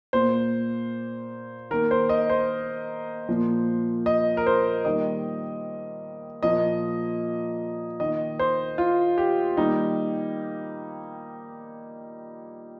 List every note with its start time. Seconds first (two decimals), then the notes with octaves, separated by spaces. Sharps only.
0.13 A#2 A#3 C5
1.71 D#3 A#3 A#4
1.91 C5
2.09 D#5
2.29 C5
3.29 A#2 F3 A#3
4.06 D#5
4.37 A#4
4.47 C5
4.85 D#3 G3 A#3 D#5
6.43 A#2 F3 A#3 D#5
8.00 D#3 A#3 D#5
8.39 C5
8.78 F4
9.18 G4
9.57 D#3 G3 A#3 D#4